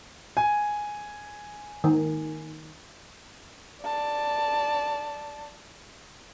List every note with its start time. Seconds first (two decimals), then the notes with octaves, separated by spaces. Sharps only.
0.37 G#5
1.84 D#3
3.83 D5 A5